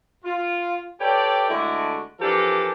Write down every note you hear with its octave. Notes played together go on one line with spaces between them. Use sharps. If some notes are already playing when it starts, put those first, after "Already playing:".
F4
G4 A4 B4 C#5 D5 G5
D3 G#3 A3 E4 F#4
E3 F3 D4 G4 A4 A#4